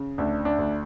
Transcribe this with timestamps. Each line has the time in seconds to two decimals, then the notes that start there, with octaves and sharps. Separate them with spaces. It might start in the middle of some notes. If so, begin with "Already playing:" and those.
Already playing: C#3
0.18 D2 D4
0.45 D4
0.59 D2